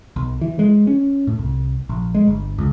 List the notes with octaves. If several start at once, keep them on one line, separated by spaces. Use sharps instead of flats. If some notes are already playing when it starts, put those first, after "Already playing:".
B1
E3
G#3
C#4
A2
C2
A#1
G#3
G1
C#2